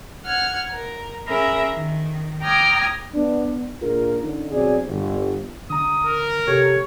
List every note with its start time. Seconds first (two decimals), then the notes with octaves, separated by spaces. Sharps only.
0.24 F#5 F6 G#6
0.72 A#4
1.28 C#4 G#4 A#4 E5 A#5 B5
1.73 D#3
2.43 G5 A#5 D6 D#6 F6 G#6
3.14 B3 D4
3.82 A#2 D4 F4 G#4 A#4
4.22 D3 C#4 D#4
4.52 B1 F#3 C4 G#4 D5
4.87 G1
5.70 D3 A#5 D#6
6.05 A#4
6.47 C3 G4 A4 C#5